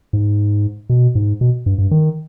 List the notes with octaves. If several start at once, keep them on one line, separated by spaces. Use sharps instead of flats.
G#2
B2
G#2
B2
G2
G2
D#3